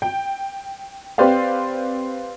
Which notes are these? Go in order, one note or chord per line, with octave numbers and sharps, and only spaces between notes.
G5
C4 G4 B4 C5 D5 F5